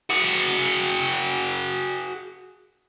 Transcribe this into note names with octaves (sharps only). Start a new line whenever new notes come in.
F#4 G#4